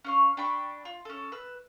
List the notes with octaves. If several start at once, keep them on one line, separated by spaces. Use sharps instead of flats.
C#4 F5 C#6
D4 G5 B5 C#6
F4
C#4 A4
B4 E6